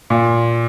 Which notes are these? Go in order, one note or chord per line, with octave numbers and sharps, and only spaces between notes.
A#2